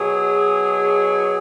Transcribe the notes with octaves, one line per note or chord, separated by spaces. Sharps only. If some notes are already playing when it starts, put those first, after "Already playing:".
Already playing: B2 F#3 G#4